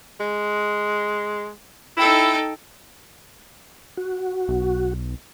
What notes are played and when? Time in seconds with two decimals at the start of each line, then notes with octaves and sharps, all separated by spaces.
0.20 G#3
1.97 D#4 E4 A4 G5
3.97 F#4
4.48 B1